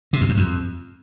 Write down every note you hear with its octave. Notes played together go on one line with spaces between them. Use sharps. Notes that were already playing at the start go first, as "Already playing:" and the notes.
C3
E2
F#2
F2